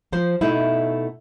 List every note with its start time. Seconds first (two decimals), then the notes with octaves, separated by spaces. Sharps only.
0.12 F3 C5
0.41 B2 A3 D#4 E4